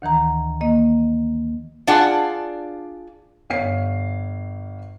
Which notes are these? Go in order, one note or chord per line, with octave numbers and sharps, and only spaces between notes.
D2 D#3 E3 A#5
D#3 A#3 D#5
D4 F4 G#4 D5 F#5
G1 C#5 F5 C7